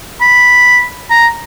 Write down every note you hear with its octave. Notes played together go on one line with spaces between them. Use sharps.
B5
A#5